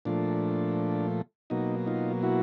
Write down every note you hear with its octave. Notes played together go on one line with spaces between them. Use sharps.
A#2 F3 A3 D4
B2 F#3 A#3 D#4
D#4 F4
E4 F#4